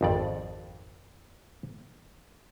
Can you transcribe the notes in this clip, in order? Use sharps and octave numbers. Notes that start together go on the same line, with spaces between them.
G#1 F2 D5